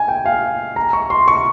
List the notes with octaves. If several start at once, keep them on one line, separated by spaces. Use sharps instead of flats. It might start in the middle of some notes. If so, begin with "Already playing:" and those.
Already playing: G#5
G5
F5
A#5
C#6
C6
C#6